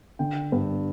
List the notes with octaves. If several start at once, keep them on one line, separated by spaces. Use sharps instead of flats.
D3 G5
G2